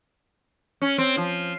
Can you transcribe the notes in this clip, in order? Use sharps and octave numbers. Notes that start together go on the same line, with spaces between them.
C#4
C4
F3